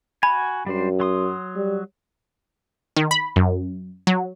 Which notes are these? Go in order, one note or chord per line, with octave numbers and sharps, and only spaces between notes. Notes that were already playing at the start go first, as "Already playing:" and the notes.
F#4 G#5 B5
F#2 G3 D4 C5
F#3 C6 D#6
G3
D#3
B5
F#2
F#3